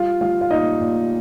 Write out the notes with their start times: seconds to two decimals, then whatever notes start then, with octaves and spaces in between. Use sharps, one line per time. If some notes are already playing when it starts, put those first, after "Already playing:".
Already playing: G3 F4 F5
0.21 G3 F4 F5
0.41 F5
0.51 A#2 D#4 D#5
0.81 A#2